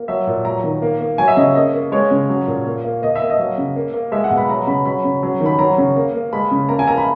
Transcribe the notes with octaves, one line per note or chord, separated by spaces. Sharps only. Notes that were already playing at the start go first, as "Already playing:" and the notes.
Already playing: A#3
F#3 E5
A#2
F#3 A#5
D#3
A#3
A#3
F#3 G#5
E5
C#3 D#5
A#3 D#5
A#3
G#3 C#5
C#3
F#3
A#2
A#3
A#3
A#3 D#5
E5
A#3
D#5
F#3
C#3
A#3
A#3
G#3 E5
F#5
B2
B5
F#3 A#5
C#3 B5
F#3 B5
C#3
F#3
D#3
B5
F#3 A#5
C#3
A#3
A#3
G#3 B5
C#3
A#3 A#5
G#5
A#3 A#5
B5